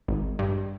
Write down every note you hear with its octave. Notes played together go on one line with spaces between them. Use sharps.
G#1
G2